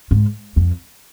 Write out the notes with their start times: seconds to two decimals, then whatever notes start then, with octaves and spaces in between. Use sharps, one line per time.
0.11 G#2
0.56 F2